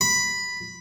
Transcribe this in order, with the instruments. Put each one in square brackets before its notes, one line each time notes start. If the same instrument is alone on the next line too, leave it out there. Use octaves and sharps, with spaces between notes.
[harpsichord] B5